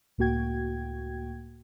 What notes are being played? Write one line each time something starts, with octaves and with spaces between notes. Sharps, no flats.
C#2 A2 A#3 F#4 G5 G#6